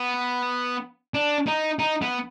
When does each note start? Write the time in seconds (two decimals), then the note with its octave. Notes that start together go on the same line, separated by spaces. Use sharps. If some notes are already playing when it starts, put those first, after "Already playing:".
Already playing: B3
1.14 D4
1.47 D#4
1.79 D#4
2.02 B3